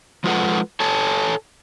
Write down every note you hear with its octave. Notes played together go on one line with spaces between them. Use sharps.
F3 G#3 F4 A4 B4 F#5
A4 C#5 G#5 A5